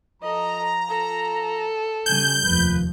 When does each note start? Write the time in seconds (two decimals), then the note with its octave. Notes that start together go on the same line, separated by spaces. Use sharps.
0.23 F3 A4 D#5 A#5
0.89 A4
2.06 G1 C#3 G3 G#5 G6
2.45 F1 D#2 F3 B4